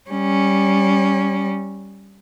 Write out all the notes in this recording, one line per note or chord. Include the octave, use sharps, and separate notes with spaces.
G3 C#4